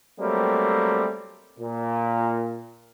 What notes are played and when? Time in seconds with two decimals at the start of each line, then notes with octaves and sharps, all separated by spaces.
0.20 F#3 G3 A3 A#3 C4
1.58 A#2